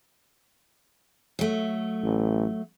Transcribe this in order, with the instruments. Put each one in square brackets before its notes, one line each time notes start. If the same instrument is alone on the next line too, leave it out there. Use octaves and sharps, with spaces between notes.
[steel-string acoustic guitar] F#3 A3
[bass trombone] A1